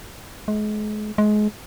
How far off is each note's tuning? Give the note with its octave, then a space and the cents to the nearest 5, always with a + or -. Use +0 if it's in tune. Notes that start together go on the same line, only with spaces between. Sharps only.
G#3 +35
G#3 +25